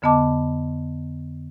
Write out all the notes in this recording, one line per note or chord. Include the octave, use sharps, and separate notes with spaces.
F2 D3 B3 D#5 A5 D6